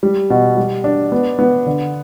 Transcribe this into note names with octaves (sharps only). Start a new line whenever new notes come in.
G3
B2
G3
D4
B3
B3
D3